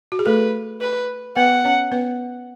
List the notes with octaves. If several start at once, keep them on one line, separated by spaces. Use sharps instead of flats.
F#4
G#4
A3 A4 B4
B4
B3 B4 F#5
C#4 C#5
B3 B4